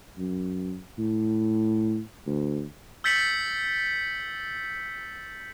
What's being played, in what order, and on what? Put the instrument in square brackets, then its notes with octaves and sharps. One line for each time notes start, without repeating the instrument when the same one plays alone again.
[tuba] F#2
A2
D2
[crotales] E6 G6 A6 B6 C#7 F#7